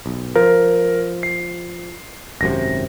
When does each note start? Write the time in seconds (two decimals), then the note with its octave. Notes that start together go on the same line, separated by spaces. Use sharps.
0.06 B1
0.35 F3 A#4
1.23 C7
2.41 G#1 F#2 C3 A#6